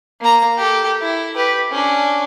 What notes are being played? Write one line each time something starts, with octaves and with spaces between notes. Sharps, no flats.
A#3 A#5
G4 A4
E4
G4 B4
C#4 D4